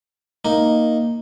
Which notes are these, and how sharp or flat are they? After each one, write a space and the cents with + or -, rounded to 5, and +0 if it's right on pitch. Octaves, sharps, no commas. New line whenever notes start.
A#3 +0 D#4 +0